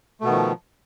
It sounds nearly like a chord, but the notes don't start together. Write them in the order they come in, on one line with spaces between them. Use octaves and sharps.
A3 B2 B3 D#3 F3